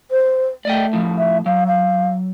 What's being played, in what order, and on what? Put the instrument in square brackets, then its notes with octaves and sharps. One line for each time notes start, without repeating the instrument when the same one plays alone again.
[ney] C5
[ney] A3 [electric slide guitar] D5 D#5 G5
[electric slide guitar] A2 F3
[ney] E5
[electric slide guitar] F#3 [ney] F5
[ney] F5